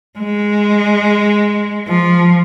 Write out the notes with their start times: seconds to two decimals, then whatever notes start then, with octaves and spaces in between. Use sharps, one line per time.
0.19 G#3
1.88 F3